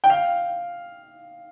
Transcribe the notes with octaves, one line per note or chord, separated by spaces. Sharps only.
G5
F5